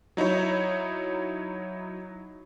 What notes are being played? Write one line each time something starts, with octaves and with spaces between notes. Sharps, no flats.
F#3 D#4 E4 C#5